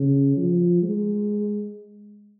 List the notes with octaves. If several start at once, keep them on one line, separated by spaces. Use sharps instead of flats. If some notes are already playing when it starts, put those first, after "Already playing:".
Already playing: C#3
F3
G#3